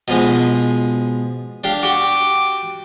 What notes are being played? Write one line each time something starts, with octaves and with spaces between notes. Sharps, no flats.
B2 F3 G#3
D4 G4 F5
F#4 G4 G5 D6